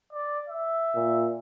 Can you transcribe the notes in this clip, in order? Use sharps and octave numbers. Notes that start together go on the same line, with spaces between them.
D5
E5
A#2